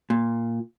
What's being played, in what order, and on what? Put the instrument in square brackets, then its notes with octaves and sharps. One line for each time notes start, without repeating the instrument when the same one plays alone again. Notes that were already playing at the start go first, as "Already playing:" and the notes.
[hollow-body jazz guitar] A#2